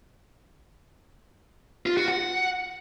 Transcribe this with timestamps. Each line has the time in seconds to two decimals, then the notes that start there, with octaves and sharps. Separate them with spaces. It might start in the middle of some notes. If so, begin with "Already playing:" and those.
1.86 F4
1.97 F#4
2.08 F#5